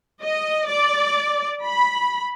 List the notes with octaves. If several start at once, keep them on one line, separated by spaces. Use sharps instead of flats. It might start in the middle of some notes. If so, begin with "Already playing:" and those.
D#5
D5
B5